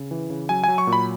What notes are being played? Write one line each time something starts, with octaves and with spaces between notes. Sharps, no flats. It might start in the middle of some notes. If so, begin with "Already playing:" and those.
Already playing: C#3
E3
C#3
F#3 G#5
F#3 G#5
C#6
A#2
B5